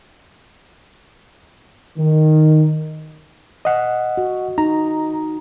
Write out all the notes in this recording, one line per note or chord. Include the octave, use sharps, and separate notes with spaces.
D#3
D#5 F#5
F#4
D#4 A#5